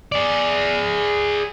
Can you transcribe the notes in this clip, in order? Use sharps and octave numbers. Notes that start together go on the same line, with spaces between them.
G#4 D5